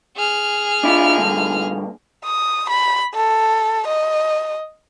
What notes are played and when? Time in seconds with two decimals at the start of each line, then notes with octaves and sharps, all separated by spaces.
0.17 G#4 F6
0.83 D4 E4 F4
1.17 G2 A#2 D3
2.24 D#6
2.70 B5
3.14 A4
3.87 D#5